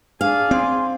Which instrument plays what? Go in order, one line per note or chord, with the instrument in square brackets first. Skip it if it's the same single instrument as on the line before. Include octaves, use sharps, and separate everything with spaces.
[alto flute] D4 [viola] G#4 D5 [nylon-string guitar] F5
[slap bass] C4 [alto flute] C6